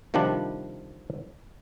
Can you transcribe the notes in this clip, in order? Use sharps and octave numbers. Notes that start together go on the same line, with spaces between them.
C3 D#3 F3 G3 D4